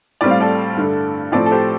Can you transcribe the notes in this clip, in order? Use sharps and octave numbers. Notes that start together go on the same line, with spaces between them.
A2 G3 C4 D5
F5
A4 D5
G2 D3 A3
A2 F3 C4 A4 D5
A4
G4 C5